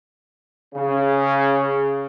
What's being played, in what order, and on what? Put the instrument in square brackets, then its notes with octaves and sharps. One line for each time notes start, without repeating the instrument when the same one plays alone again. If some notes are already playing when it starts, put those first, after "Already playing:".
[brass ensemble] C#3